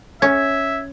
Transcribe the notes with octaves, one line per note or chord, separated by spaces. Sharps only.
C#4 E5 G#6